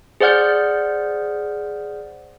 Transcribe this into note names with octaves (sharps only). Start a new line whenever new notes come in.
G#4 C5 D5 F#5 F6 G6